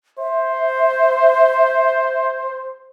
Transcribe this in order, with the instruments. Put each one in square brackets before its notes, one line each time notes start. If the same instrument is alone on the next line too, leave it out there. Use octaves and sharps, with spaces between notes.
[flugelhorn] C5 [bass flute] E5